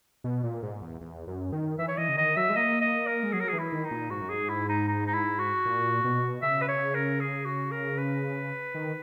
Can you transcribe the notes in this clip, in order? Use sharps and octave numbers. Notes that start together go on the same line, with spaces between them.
B2
A#2
G#2
E2
E2
F#2
D#3
E3 E5
C#5
E3 D#5
C#3
D#3 D#5
F#3 E5
G#3
A#3 D#5
D#5
A#4
G#3
F#3 G#4
A#4
E3 G#4
E4
D#3
D#4
A#2
G#2 F#4
F#2
G#2 G#4
E4
D#4
D#4
D#4
E4
F#4
A#2
B2
C#3 E5
B4
C#5
A#4
G#4
F#4
A#4
B4
D#3